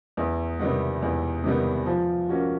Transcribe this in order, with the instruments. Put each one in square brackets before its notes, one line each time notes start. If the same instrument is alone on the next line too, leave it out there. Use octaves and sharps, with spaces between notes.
[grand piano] E2
C3 D#3 G3 B3
E2
C3 D#3 G3 B3
F3
A#3 C#4 F#4